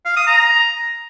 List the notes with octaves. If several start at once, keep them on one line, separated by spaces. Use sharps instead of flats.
F5
D#6
A#5